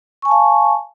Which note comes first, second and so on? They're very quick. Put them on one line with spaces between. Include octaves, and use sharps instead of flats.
C#6 G#5 A5 F5